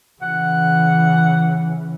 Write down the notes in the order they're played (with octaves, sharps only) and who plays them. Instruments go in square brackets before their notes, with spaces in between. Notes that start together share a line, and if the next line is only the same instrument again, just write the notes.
[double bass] C#3 E3 [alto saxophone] F#5